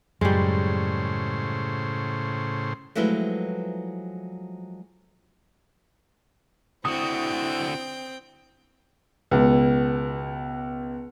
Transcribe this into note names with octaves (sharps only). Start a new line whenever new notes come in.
F#2 A2 C#3 G3 G#3 C5
F3 F#3 G#3 A3 E4 B4
D3 C4 E4 F#4 G5 D#6
C#2 B2